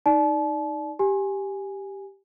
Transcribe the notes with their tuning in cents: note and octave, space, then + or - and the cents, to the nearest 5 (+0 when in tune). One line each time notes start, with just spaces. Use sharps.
D#4 +0 D5 +0 A5 -35
G4 +0 G#5 +0